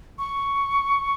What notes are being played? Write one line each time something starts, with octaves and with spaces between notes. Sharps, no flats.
C#6